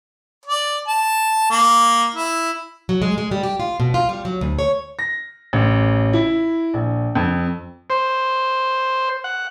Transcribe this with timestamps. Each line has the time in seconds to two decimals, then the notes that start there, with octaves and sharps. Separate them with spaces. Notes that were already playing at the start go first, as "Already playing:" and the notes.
0.45 D5
0.87 A5
1.50 A#3
2.15 E4
2.89 F#3
3.02 G#3
3.18 G#3
3.31 G3
3.43 G4
3.60 F4
3.80 B2
3.94 F4
4.09 G3
4.25 F#3
4.41 D2
4.59 C#5
4.99 A#6
5.53 A1
6.13 E4
6.74 A#1
7.15 F2
7.90 C5
9.24 F#5